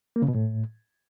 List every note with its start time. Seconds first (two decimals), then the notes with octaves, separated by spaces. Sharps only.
0.16 A#3
0.22 C#3
0.28 B2
0.35 A2